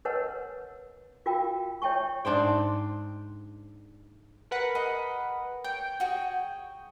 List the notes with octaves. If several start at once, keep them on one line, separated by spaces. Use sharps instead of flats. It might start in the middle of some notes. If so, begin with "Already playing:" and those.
A#4 B4 C#5 D#5 F#5 A5
F4 F#4 A#4 F5 G5
C#5 E5 G5 A5 C#6
G#2 D4 C5 G5
A#4 B4 F#5
G#4 D#5 B5
C#5 G5
F#4 G#4 C#5